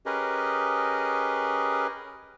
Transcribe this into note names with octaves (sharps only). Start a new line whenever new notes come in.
C#4 G4 G#4 A#4 B4 D#5